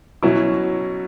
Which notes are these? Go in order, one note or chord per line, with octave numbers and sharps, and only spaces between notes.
B2 F#3 C#4 E4